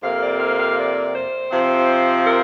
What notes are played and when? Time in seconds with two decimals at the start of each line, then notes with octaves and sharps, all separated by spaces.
0.03 F2 C3 A#3 F5
0.22 D5
0.40 F5
0.59 F5
0.77 D5
1.14 C5
1.52 C3 F3 C4
2.26 A#4